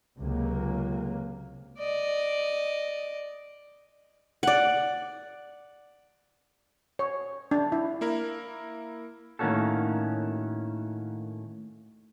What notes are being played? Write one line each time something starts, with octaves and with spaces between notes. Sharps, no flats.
C#2 C3 F#3 A#3
D5 D#5
D5 F#5
C#5
D4
E4
A#3 E4 A#4
A2 D#3 A#3 C#4 F#4 A4